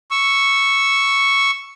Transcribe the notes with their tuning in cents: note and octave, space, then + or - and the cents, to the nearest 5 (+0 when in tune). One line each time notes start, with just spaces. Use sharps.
C#6 +0 E6 +0